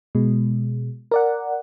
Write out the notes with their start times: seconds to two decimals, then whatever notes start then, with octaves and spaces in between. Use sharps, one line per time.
0.15 B2 G#3
1.11 A#4 D5 F#5